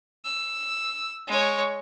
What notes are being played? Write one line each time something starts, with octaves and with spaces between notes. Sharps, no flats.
E6
G#3 C#5